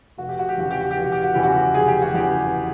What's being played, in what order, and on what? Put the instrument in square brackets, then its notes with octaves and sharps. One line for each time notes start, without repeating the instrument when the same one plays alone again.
[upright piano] F1 F#4
G4
F#4
G4
E2 C#3 E3 F#4
G4
F#4
G4
F1
F#4
G4
F#4
E2 C#3 E3 G4
F#4
F1 G#4
G4
F#4
E2 C#3 E3 G4